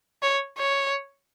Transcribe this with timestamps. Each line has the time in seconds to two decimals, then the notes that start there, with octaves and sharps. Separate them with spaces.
0.23 C#5
0.58 C#5